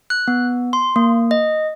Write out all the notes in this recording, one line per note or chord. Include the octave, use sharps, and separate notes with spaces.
F#6
B3
C6
A#3
D#5